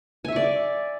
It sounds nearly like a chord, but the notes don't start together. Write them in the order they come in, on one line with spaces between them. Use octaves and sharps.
G#5 E5 C#6 D5